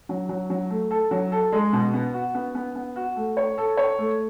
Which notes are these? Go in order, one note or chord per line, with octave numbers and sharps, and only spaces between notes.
F#3
F#3
F#3
A3
A4
F#3
A4
G#3
B2
B3
F#4
B3
B3
B3
F#4
A3
C#5
A4
C#5
A3